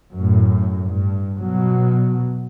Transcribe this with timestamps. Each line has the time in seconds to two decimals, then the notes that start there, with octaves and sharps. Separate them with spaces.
0.13 F#2 A2
0.89 G2
1.37 B2 F#3